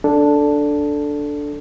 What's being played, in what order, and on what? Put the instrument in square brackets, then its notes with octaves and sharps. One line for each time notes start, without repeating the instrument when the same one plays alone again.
[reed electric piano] D4 A4